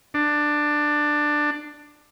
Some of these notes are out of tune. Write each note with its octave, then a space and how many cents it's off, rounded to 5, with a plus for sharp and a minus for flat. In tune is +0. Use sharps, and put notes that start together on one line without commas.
D4 +15